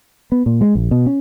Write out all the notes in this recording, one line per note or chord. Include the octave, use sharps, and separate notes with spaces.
B3
A#2
G#3
A#1
B2
C#4